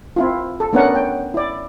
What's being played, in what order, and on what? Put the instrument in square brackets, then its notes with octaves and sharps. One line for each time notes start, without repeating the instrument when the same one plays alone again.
[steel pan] C4 E4 F4
A4
A3 B3 C#4 D4 A#4 F#5
G5
E4 D5